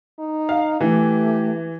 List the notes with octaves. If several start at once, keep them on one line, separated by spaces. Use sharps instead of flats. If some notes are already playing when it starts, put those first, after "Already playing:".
D#4
F5
E3 A3 G4